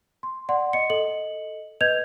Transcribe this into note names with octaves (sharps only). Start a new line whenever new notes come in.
C6
D5 F#5 C6
D#5 C#7
A4 D#5 F#7
B4 D#5 G6 G#6 F7